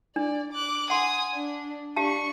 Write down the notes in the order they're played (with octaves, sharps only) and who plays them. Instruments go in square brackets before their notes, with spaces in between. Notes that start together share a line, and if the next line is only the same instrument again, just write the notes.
[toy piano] D4 [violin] D5
[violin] D6 F#6
[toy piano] F#5 C6 [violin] G#5 D#6
[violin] D4
[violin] D4 C#6 [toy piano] G4 F5 A5